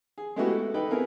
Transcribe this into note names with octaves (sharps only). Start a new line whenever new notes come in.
G#4
G#3 A3 B3 E4 F#4 G4
A4
D#4 A4 B4 G5
B3 C4 E4 G#4 A#4